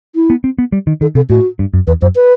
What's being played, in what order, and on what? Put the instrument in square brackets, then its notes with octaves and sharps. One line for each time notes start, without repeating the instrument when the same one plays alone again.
[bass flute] E4
[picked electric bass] B3
C4
B3
G3
D#3
[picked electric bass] D#3 [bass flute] A4
[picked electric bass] C3 [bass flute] A4
[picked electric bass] A2 [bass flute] F#4
[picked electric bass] G2
F#2
[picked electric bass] E2 [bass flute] B4
[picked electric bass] F#2 [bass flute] C5
[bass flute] B4